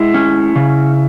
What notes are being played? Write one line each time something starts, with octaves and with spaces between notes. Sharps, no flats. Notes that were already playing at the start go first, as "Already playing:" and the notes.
Already playing: G#3 E4
C#4
C#3